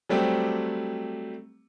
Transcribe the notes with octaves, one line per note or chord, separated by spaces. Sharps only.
F#3 G3 A3 C4 G4